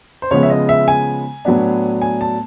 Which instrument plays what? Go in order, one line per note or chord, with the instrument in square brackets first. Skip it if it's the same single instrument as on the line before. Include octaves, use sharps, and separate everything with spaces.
[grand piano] C5
C#3 F3 G#3 B3 C#5
E5
D#5
E5
G#5
A2 F#3 B3 D4
G#5
A5